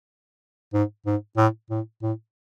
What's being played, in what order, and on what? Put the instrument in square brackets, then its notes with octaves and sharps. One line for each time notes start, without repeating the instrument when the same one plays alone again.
[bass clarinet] G#2
G#2
A2
A2
A2